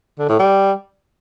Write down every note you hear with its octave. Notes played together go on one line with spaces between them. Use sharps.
D3
A2
G3